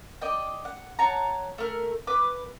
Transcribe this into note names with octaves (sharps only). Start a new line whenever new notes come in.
D5 D#5 G5
F#5
C#5 F#5 A5 A#5
A3 A#4
B4 D6